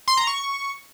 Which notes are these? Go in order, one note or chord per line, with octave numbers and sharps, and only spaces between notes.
C6
A#5
C#6